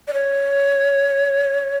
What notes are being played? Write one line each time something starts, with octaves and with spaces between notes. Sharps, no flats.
D5
C#5